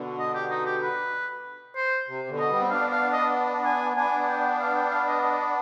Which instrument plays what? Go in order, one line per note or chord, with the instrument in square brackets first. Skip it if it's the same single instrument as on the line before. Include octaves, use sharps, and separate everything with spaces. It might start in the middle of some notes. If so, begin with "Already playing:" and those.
Already playing: [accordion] B2 D3
[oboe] D#5
G4
D#4
G4
B4
C5
[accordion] C3
B2 D3
[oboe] D#5
[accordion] G3 B3
C4
[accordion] B3 D4 [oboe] F5
[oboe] F5
D#5
G#5
[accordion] B3 D4 [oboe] G#5
[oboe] G5
F5
G5
F5
D#5
D#5